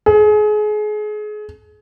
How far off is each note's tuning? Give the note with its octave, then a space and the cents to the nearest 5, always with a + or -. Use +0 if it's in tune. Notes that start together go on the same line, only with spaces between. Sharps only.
G#4 +30